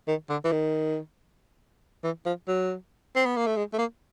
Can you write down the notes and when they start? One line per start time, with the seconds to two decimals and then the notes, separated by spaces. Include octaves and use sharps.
0.08 D#3
0.30 D3
0.44 E3
0.52 D#3
2.04 E3
2.26 F3
2.48 F#3
3.16 C4
3.26 B3
3.37 A#3
3.47 A3
3.57 G#3
3.73 A3
3.78 A#3